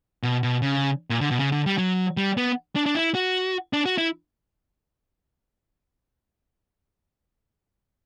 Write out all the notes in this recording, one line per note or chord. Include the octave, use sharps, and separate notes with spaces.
B2
B2
C#3
A#2
D3
B2
C#3
D3
G3
F#3
G3
B3
D4
D4
E4
F#4
D4
F#4
E4